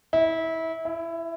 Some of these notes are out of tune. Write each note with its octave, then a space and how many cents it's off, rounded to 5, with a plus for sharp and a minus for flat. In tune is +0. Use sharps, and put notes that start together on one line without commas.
E4 -25
E4 +15